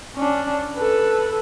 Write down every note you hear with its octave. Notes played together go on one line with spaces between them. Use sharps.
C#4 D4
A4 B4